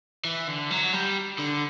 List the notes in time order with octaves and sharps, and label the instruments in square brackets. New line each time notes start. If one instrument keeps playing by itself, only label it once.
[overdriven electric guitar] E3
D3
F#3
G3
D3